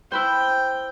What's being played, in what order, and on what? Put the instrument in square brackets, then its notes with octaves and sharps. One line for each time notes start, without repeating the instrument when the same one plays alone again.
[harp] E4 B4 C5 [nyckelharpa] G5